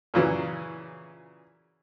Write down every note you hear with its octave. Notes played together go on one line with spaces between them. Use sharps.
A#2 C#3 E3 F#3